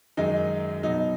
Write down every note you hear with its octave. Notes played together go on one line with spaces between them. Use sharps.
F#2 D#3 G#3 D#4
B2 F#3 D#4